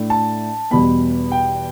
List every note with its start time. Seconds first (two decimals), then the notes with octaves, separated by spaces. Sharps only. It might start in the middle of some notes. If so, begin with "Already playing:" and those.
Already playing: A2 A3 D4
0.10 A5
0.71 E2 B2 G3 B3 B5
1.32 G5